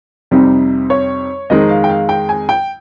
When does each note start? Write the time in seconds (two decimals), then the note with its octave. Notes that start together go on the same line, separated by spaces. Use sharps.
0.31 F2 C3 G3 C4 D#4
0.90 C#5
1.50 F2 D#3 G#3 C4 D#4 D#5
1.69 F5
1.84 G5
1.89 F5
2.09 G5
2.29 G#5
2.49 G5